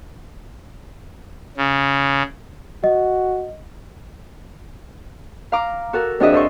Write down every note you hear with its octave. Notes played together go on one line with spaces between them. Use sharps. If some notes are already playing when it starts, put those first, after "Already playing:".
C#3
F#4 D#5
F5 A#5 D6
F#4 A4 A#4
F2 D4 F#4 G#4 D#5 E5
F3 A4 C5 C#6